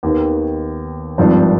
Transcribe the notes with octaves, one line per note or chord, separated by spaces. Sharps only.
D#2 D#3 B3
G#1 G2 F3 C4